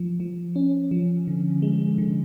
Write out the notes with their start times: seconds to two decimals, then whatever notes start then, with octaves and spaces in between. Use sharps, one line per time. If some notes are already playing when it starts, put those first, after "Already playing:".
Already playing: F3
0.20 F3
0.56 C#4
0.91 F3
1.28 D3
1.62 G#3
1.98 D3